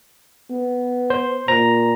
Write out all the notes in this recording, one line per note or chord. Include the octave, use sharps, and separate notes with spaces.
B3
C5
A#2 A#5